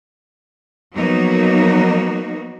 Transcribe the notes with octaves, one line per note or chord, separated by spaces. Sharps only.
F3 F#3 A#3 B3 D#4 F#4